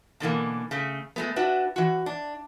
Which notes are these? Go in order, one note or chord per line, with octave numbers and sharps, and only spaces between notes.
B2 D3 E3 A#3
C#3 A3
G#3 A3 B3
D4 F#4 B4 E5
E3 F#4
D4